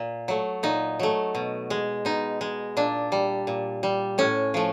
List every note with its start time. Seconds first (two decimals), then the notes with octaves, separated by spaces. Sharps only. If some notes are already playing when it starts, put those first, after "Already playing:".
Already playing: A#2
0.28 F#3 A3
0.63 A#2 D#4
0.99 F#3 A3
1.35 B2
1.70 G#3
2.05 B2 D#4
2.41 G#3
2.77 A#2 D4
3.12 G3
3.47 A#2
3.83 G3
4.18 A2 C#4
4.54 F3 A3